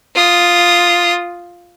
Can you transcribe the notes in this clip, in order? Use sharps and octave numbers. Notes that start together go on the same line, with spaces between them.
F4 D#6